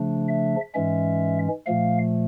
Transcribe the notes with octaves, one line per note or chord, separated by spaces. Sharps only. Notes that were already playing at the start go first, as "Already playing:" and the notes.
Already playing: C#3 F3 A3 D4
E5
G#2 E3 G#3 C#4 E5
A#2 F3 A3 F5